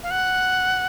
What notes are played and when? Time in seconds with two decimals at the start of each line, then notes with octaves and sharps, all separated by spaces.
0.03 F5
0.11 F#5